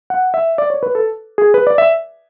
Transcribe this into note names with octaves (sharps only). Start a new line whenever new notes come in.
F#5
E5
D5
C#5
B4
A4
G#4
B4
D5
E5